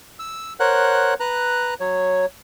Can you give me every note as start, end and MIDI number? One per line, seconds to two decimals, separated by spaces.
0.19 0.53 88
0.60 1.14 70
0.60 1.14 72
0.60 1.14 73
0.60 1.14 78
0.60 1.14 90
1.20 1.74 71
1.20 1.74 82
1.20 1.74 90
1.80 2.26 54
1.80 2.26 73